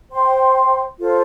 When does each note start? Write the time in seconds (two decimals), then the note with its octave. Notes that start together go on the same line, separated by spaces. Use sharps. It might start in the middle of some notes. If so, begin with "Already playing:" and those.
0.11 C5 G5 C6
0.98 F4 A4 C5 F5